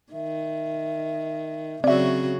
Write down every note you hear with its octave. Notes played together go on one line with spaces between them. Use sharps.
D#3 E5
C#3 F#3 C4 F#4 D5 E5